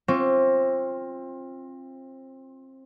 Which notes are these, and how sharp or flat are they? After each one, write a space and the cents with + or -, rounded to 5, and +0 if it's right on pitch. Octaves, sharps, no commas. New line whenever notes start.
C4 +25 F4 +0 C#6 +35